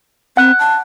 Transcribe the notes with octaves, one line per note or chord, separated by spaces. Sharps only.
C4 F#5 F#6
A5